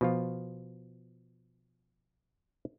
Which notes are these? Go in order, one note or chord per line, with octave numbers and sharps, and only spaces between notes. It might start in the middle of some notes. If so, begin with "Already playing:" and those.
B2 F3 F4